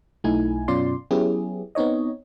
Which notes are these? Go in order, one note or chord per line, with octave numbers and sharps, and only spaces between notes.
B1 A3 D#4 E4 G#5
F#2 B2 C#4 F4 D5 C6
F#3 B3 C#4 E4 G4 G#4
B3 C4 D#4 C#5 D#5